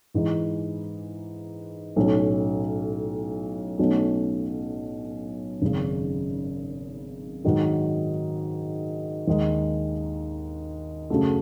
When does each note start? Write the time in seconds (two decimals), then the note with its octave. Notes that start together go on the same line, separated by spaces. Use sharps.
0.14 G#2 E3 G#3 D#4
1.96 B1 A2 F#3 A3 C#4
3.79 B1 B2 A3 C#4 F#4
5.61 G#1 F#2 C#3
7.45 G#2 D#3 F#3
9.27 D#2 D#3 G#3
11.10 F#2 C#3 F#3 A3